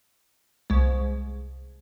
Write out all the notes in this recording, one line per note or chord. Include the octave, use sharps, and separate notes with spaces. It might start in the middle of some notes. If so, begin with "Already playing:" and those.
C2 G#3